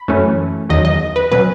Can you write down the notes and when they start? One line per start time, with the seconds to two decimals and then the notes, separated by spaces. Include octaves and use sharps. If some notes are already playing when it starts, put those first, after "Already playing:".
Already playing: B5
0.08 F#2 E3 A3 C#4
0.69 E2 D#3 F#3 D#5
0.85 D#5
1.16 B4
1.31 B2 F#3 C#4 B4